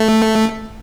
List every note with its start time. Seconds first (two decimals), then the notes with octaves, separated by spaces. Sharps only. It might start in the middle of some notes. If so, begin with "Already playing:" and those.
Already playing: A3